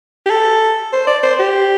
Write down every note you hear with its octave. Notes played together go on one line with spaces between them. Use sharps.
G4
A4
C5
D5
C5
G4